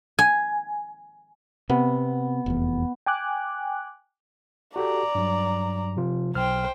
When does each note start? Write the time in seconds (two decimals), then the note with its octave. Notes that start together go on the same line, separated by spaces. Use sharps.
0.19 G#5
1.69 C3 B3
2.46 F1 E2
3.06 G5 G#5 D6 F#6
4.76 F#4 G4 A4 D5 A#5
5.15 G2 F#3
5.97 C3 F3 F4
6.35 B1 C5 G5 F6